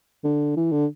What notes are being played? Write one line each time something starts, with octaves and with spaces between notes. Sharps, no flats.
D3
E3
D3